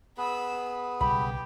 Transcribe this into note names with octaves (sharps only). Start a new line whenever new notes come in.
B3 G#4 B4 B5 E6
B1 C#3 G3 G4 B5